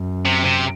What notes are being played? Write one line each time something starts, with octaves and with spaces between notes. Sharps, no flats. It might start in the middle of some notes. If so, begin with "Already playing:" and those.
Already playing: F#2
C3
C3